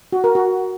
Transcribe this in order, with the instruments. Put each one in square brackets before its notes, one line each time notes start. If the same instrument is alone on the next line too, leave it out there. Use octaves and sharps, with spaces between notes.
[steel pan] F#4
A#4
F#4